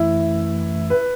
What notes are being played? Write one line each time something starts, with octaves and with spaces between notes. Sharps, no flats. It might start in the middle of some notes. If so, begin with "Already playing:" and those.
Already playing: F#2 E3 A3 E4
B4